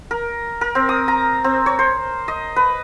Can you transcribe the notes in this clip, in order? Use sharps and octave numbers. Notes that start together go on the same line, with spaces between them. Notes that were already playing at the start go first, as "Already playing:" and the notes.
A#4
A#4
C4
D#6
A#5
C4
C#5
C5
D#5
B4